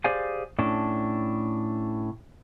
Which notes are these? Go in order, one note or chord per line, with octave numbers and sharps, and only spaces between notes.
G4 G#4 C5 D5 F5 G#5
A2 C#4 D4 A5